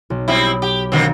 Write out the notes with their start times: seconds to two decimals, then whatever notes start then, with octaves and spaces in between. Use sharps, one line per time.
0.10 B1
0.28 G3 C4 E4 B5 D#6
0.62 G4
0.92 B2 D3 D#3 A#3 C4